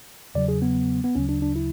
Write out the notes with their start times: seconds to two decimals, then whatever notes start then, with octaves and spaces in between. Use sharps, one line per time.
0.35 E2 C#3 F#3 D5
0.48 G#4
0.62 B3
1.04 B3
1.15 D2 C#3 F#3 C#4
1.29 D4
1.42 D4
1.56 E4